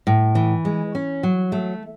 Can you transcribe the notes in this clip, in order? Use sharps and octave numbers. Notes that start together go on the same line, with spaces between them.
A2
E3
G#3
C#4
F#3
A3